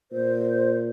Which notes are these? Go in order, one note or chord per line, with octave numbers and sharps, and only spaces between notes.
A#2 C5